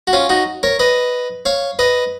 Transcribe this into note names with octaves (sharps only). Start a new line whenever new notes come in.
F#4
C#4 F4
D#4 F#4
A#4 C#5
B4 D#5
C#5 F5
B4 D#5